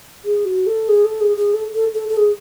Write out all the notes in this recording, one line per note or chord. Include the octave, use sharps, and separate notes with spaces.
G#4
F#4
A4
G#4
A4
G#4
G#4
A4
A4
A4
A4
G#4